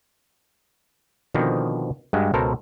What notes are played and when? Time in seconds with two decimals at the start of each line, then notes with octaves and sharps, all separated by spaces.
1.34 B2 D3 D#3 F3 C4
2.13 G2 G#3 F#4 G4
2.34 C#2 B2 A4 A#4 C5 A#5